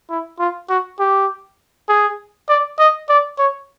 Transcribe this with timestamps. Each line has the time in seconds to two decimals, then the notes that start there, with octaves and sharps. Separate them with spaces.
0.10 E4
0.40 F4
0.69 F#4
1.00 G4
1.89 G#4
2.49 D5
2.79 D#5
3.09 D5
3.38 C#5